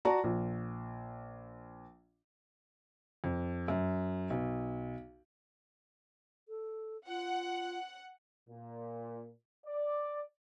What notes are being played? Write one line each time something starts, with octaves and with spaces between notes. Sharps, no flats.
F#4 D5 A5 A#5
A#1
F2
F#2
B1
A4
F4 F#5
A#2
D5